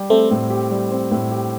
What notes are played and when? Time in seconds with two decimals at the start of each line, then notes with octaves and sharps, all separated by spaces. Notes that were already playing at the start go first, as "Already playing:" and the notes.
Already playing: G3 G4
0.10 A3 C4
0.31 A2
0.50 G4
0.71 G3
0.91 C4
1.11 A2
1.31 G4